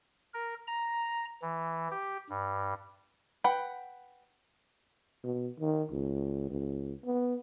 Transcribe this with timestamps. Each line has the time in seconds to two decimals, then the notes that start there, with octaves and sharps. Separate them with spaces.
0.34 A#4
0.67 A#5
1.42 E3
1.91 G4
2.29 G2
3.44 B4 F#5 G5
5.24 B2
5.60 D#3
5.91 C#2
6.50 C#2
7.05 B3